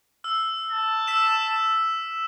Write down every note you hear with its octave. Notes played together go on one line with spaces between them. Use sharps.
E6 F6
A5
E6 B6 E7